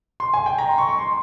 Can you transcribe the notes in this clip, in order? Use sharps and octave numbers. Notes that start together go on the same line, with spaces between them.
C6
G#5
G5
A#5
C6
C#6
C#6
C6